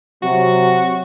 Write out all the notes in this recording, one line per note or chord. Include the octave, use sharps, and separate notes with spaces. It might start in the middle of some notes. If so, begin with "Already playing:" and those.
C3 F#3 F#4